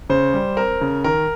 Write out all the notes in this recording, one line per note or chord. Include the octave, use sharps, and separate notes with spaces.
C#3 C5
G3
C4 A#4
C#3
D#3 A#4